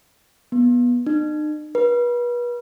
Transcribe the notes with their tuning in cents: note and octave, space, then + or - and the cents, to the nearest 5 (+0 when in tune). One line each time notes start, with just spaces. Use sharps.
B3 -20
D#4 -45
B4 -35